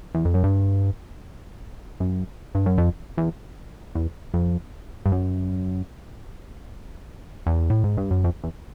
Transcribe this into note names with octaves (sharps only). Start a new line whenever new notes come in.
E2
F2
F#2
G2
F#2
G2
F#2
F2
E2
E2
F2
G2
F#2
E2
A2
G#2
G2
F#2
F2
E2